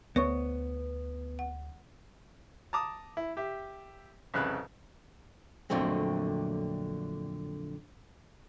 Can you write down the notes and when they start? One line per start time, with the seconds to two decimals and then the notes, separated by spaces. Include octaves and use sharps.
0.16 D2 B3 C#5 C#6
1.39 F#5
2.73 A5 A#5 D6 D#6
3.17 E4
3.37 G4 E5
4.34 C2 F2 C#3 B4 B5 F#6
5.70 F2 A#2 D3 F#3 A3 C4